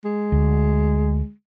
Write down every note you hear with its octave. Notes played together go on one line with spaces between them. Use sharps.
G#3
D2